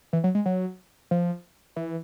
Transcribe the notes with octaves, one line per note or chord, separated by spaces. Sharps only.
E3
F#3
G#3
F#3
F3
E3